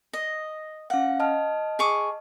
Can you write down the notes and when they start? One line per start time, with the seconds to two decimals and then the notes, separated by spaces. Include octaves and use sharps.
0.13 D#5
0.90 C#4 F5 F#5
1.20 D#5 A5 F6
1.79 G#4 C#6 D6